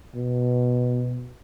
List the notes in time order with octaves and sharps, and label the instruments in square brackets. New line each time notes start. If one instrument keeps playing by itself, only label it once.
[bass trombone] B2